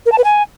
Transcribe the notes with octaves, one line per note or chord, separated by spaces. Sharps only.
A#4
A5
B4
G#5